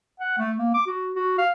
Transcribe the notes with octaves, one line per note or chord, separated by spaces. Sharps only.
F#5
A3
A#3
D6
F#4
F#4
F5